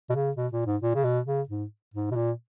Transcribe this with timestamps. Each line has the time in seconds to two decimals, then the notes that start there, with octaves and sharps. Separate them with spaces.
0.10 B2
0.15 C#3
0.37 B2
0.52 A#2
0.66 G#2
0.81 A#2
0.95 C#3
1.04 B2
1.26 C#3
1.49 G#2
1.94 G#2
2.11 B2
2.16 A#2